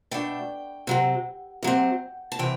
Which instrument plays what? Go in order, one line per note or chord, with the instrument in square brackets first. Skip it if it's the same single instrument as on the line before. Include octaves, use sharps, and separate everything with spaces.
[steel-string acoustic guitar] B2 A3 D4 G5
C3 F#3 C4
C3 F#3 C4
A5
C3 E3 G5